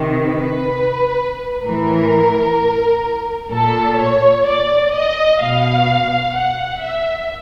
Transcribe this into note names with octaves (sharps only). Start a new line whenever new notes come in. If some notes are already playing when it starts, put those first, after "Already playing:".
Already playing: C3 D#3
B4
A2 E3 A#4
A#2 A4
C#5
D5
D#5
B2 F5
F#5
E5